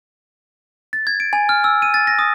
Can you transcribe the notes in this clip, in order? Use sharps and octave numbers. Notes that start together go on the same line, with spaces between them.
A6
G#6
D7
G#5
F6
E6
D#7
A6
A#6
D#6